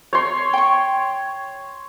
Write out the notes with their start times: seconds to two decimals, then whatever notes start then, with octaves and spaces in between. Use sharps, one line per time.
0.13 C#5 C6
0.53 G5 C#6